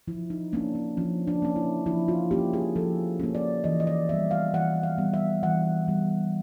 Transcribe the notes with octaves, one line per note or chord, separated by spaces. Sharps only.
F3 E4
D#4
A#3 C#4 D4
C#4
F3 C#4
D4
A#3 C#4
E4
F3 E4
F4
A#3 C#4 G4
G#4
F3 A4
A#3 C#4
D5
E3 D#5
D#5
D5
G3 B3 E5
F5
E3 F#5
F5
G3 B3
E5
E3 F#5
G3 B3